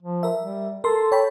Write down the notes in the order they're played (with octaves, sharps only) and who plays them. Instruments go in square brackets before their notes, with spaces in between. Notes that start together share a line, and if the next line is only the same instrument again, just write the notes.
[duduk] F3
[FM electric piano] A#4 E5
[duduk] G3
[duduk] A4 [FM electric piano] A#4 C6
[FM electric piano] C#5 G5 B5